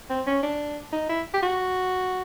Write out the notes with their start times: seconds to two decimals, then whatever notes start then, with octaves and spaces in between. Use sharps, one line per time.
0.10 C4
0.26 C#4
0.43 D4
0.92 D#4
1.09 E4
1.34 G4
1.42 F#4